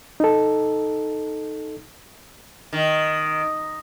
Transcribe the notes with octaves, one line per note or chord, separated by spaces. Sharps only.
D#4 A4
D#3